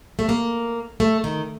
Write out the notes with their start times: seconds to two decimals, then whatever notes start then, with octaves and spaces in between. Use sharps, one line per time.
0.19 A3
0.29 A#3
1.00 A3
1.24 D#3